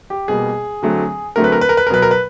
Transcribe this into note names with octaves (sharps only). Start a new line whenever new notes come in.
G4
B2 G3 A#3 G#4
D3 F#3 A3 C4
D3 F#3 A3 C4 A#4
B4
A#4
B4
A#4
B4
A#4
B2 F#3 B3 B4
A#4
B4